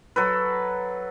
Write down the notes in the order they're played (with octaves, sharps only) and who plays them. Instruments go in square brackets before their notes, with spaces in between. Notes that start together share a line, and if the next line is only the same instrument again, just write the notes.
[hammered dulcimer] F#3 A4 B4